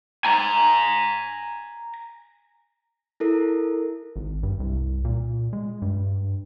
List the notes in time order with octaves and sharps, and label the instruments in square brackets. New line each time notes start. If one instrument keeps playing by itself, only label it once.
[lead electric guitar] G#5 A#5
[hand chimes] E4 A4 A#4
[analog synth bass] G#1
G2
C2
A#2
G#3
G2